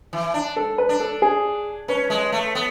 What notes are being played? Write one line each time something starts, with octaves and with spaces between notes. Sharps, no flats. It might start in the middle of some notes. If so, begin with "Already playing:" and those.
E3
D4
A4
B4
D4
A4
G#4
C#4 B4
G#3
A3
B3